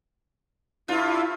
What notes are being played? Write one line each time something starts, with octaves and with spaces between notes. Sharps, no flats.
G2 E4 F4